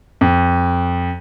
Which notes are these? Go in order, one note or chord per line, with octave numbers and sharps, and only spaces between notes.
F2